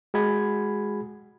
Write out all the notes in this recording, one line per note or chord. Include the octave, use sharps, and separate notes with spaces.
G#3 F#4 G#4 B5 G#6